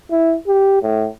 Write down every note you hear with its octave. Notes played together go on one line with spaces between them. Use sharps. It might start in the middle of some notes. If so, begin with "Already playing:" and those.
E4
G4
A2